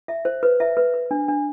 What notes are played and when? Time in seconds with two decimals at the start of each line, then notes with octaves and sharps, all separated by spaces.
0.08 E5
0.25 C5
0.43 B4
0.60 E5
0.77 B4
0.94 B4
1.11 D4
1.28 D4